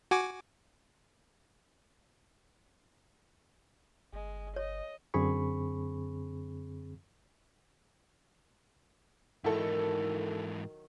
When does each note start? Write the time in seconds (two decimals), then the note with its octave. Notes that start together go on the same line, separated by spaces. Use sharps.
0.11 F#4 G#5 D6
4.13 G1 G#3
4.56 C#5 D#5
5.14 F#2 D3 C4 G#4 B5 C#6
9.44 G#2 D#3 E3 F#3 E4 A4